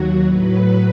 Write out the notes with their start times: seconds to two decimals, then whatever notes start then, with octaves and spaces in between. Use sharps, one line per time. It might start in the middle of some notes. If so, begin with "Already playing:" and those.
Already playing: D#2 F#3 F#4
0.24 A2 F#3 B4